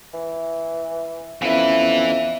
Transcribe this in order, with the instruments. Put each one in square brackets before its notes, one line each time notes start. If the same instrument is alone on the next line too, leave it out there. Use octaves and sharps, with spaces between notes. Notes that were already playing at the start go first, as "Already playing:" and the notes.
[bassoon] E3
[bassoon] F2 [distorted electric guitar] E3 B4 [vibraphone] B3 C#4 E4 [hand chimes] E5 F5